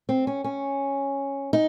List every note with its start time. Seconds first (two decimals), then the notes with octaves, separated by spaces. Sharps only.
0.09 C4
0.27 C#4
0.44 C#4
1.53 D#4